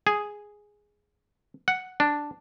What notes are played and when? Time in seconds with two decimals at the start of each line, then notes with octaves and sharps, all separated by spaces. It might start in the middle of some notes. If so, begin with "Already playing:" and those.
0.07 G#4
1.68 F#5
2.00 D4